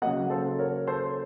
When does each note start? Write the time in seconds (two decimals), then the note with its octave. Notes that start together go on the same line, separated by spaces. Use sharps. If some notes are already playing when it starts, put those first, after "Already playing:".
0.02 C#3 F#3 A#3 D#5 F#5
0.30 A4 C5
0.59 A#4 C#5
0.87 A4 C5